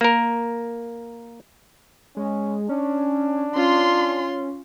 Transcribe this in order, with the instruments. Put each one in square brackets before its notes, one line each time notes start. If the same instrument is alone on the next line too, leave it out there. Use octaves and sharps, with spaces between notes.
[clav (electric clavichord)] A#3 A#4
[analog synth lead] G#3 [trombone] C#4
[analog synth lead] C#4 [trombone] D4
[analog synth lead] C#4 [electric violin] F4 C6